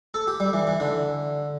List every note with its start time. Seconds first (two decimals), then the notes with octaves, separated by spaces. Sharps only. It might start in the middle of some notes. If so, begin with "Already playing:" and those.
0.14 A4
0.27 G4
0.40 G3
0.53 E3
0.67 E3
0.80 D3